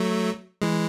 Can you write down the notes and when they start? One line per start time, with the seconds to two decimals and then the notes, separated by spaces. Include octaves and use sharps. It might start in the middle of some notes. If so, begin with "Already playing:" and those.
Already playing: F#3 A3
0.62 E3 G#3